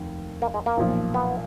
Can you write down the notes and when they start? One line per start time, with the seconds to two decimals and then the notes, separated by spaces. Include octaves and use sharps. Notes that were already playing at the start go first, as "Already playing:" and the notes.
Already playing: F1 D#2 D#3
0.42 A#3
0.54 G#3
0.66 A#3
0.77 B1 A#2 F3
1.14 B3